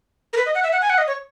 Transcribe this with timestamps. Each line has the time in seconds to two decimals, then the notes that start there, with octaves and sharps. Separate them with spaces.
0.33 A#4
0.37 B4
0.46 D#5
0.55 F#5
0.63 E5
0.72 F#5
0.81 G#5
0.90 F#5
0.98 D#5
1.07 C#5